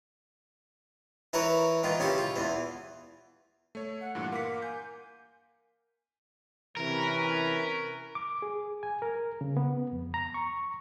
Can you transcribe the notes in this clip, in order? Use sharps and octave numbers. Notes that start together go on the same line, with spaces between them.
E3 E4 A#4 B4 C#5
D#3 E3 F4
C#3 C#4 E4 G4
F4
E2 E3
A3 C#5
F#5
G2 A#2 E3 F#5
A#3 F#5 C6 D6 B6
G#5 G6
C3 E3 C#4 A#4 B4
D6
G#4
G#5
A#4
C#3
B3
F2
A#5
C#6